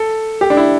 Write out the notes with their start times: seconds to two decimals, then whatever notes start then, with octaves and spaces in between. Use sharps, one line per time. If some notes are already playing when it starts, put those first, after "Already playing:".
Already playing: A4
0.41 G4
0.50 D4
0.57 E4